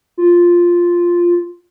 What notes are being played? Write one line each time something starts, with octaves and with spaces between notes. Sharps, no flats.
F4